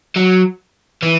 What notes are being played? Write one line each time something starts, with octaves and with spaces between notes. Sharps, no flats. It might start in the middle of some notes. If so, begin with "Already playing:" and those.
F#3
E3